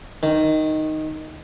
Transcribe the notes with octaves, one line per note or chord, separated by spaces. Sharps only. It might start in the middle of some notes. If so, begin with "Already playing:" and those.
D#3